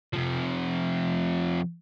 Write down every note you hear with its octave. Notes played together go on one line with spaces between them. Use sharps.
C3 F3